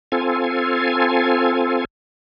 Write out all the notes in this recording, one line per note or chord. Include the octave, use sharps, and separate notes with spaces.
C4 F4 A4 G#5